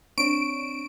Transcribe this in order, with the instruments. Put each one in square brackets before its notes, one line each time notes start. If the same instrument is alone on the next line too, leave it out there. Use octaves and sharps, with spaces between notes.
[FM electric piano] C4 D4 C#5 [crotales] C#6 [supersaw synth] D7